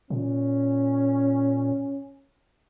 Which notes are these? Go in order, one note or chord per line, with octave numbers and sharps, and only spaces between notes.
A#2 C#4